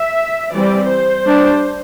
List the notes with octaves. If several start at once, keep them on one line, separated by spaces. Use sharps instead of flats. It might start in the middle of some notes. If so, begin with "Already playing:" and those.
Already playing: E5
E3 G3 C4 D5
C5
G3 D4